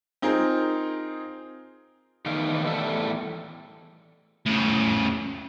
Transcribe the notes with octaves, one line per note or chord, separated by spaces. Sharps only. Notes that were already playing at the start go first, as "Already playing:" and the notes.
C4 D#4 F4 G#4 A#4 C5
E2 D#3 A3 D#4 F5
E2 A2 G3 A4 E5
A2 C#3